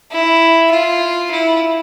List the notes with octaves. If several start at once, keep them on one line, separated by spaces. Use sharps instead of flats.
E4
F4
E4